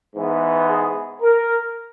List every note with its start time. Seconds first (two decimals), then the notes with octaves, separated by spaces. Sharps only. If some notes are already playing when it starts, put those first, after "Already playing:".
0.14 G#2 E3 B3
0.68 G#4
1.22 A#4